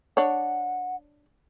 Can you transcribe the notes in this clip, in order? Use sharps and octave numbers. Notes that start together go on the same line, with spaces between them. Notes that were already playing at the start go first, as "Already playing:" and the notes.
D4 C#5 F#5